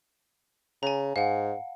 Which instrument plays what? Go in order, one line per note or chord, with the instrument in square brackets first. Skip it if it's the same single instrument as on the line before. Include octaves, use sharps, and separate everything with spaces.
[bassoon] C#3 [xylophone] G#5 A#5
[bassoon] G#2 [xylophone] F5 F#5